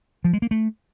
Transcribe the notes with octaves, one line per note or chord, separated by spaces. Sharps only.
F3
G#3
A#3
A3